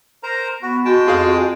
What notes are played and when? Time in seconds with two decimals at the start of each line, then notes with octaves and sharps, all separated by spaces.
0.23 A#4 C5 A#5
0.62 B3 F#4
0.85 G#3 F#4 G5 A5
1.07 F2 F4 G#4 F5